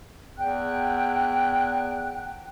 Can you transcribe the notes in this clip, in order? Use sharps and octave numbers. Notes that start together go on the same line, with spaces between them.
E2 G5 F#6